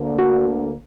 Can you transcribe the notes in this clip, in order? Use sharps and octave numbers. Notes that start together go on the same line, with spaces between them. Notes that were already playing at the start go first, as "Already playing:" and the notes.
Already playing: D2 D3 A#3
F#4